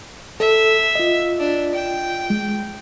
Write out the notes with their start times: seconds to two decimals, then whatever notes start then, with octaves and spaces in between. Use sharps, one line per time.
0.40 A4 E5
0.95 F4 D#5
1.39 D4
1.75 G5
2.30 G#3